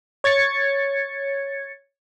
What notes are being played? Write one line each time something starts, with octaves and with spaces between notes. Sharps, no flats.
C#5 G#6 A6 C#7